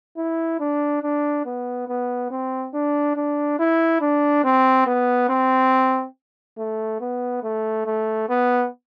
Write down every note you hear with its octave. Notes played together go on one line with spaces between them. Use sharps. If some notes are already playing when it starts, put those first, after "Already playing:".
E4
D4
D4
B3
B3
C4
D4
D4
E4
D4
C4
B3
C4
A3
B3
A3
A3
B3